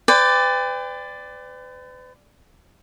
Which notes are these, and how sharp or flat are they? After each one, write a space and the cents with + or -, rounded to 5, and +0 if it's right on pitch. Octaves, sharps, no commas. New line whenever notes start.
B4 +45 D5 +0 G5 +35